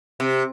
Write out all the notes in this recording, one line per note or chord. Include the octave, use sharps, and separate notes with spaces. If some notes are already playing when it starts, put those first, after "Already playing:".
C3